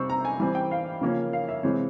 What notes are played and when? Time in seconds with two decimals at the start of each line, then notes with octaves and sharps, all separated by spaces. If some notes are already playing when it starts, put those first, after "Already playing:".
Already playing: C3 G3 C4 C#6 E6
0.10 A#5
0.25 G#5
0.40 E3 G3 C4 G#5
0.55 G5
0.71 F5
1.01 C#3 F3 A#3 C#4
1.33 F5
1.48 E5
1.63 C3 E3 G#3 C4 C#5